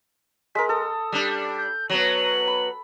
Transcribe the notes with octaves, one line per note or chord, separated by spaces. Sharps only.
G#3 A#4 B6
A4 D#6
G3 D4
G6
F#3 B3 F#7
B5